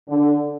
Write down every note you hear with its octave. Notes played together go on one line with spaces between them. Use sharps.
D3